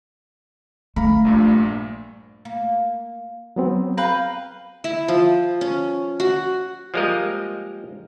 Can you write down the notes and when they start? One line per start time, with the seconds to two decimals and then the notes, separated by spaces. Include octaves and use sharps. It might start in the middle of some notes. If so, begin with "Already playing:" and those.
0.96 A3 F5 A#5 B5
1.25 A#1 G2 A#2
2.45 A#3
3.56 F#3 B3 C4
3.97 B4 F5 G5 A#5
4.84 E4
5.08 F3
5.61 C#4
6.20 F#4
6.94 F3 G3 G#3 A#3 A#4 D#5